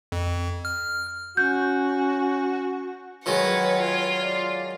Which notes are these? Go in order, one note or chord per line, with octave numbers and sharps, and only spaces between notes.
F2
F6
C#4 F#4 G6
D#3 F#3 G#3 B4 C#5 F#5
F4
D5